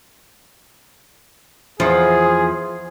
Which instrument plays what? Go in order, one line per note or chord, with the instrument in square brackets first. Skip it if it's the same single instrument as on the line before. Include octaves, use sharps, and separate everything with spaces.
[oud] E2 F3 [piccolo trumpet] G#4